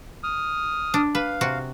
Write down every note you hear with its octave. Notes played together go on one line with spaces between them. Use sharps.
D#6 F6
D4
B4 F5
C3 F#4